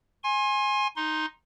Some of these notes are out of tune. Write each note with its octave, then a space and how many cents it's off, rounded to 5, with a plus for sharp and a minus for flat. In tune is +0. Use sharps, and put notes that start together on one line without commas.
G#5 +0 C6 +35
D#4 +0 C6 +15